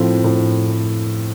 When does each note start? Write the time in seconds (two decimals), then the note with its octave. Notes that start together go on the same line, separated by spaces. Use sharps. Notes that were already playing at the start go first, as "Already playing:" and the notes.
Already playing: A2 F3 C4
0.24 A2